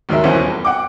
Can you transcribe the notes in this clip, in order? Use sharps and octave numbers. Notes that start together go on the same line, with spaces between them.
F#1 D#2 D#3 F#3 A#4 E5
D#1 B1 E3 C#4 F#4 C5
E1
F#5 G5 D6